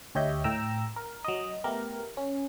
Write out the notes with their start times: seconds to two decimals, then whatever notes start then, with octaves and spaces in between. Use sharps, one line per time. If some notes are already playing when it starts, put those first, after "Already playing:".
0.15 D2 G4 C#5 D#5 E5 G6
0.44 A2 G5 A#5 E6
0.96 A#4
1.25 F#3 D#5
1.64 A3 B3 G4 A#4
2.17 C#4